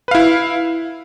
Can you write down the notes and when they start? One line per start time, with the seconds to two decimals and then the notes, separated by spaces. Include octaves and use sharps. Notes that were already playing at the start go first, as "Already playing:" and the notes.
0.08 B4
0.11 F5
0.15 E4